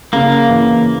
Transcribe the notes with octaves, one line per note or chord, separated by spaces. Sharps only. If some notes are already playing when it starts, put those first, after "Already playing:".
C#3 A#3
E3